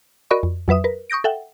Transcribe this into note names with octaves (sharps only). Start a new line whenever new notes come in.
F#4 A#4 D5 D#5 B5 C#6
F2
F2 F#3 B4 E5 D#6
A#4 B4
C#6 D#6 G6 A#6 D7
A4 E5 F#5 G5